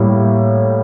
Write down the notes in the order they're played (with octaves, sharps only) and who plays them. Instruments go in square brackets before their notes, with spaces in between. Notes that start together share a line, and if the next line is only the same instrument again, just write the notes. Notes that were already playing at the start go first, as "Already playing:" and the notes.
Already playing: [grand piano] A2 G3 A#3